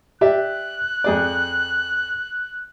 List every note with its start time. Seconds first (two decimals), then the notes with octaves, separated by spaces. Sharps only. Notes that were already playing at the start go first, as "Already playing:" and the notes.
0.21 G4 D5 E5 F#6
1.04 F2 G#4 D5